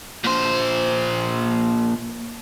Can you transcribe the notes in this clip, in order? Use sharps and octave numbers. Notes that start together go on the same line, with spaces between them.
A#2 C5